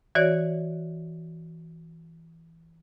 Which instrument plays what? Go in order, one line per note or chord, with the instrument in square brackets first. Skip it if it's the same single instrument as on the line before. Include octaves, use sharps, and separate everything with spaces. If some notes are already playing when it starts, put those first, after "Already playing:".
[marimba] E3 F#4 C#5 D5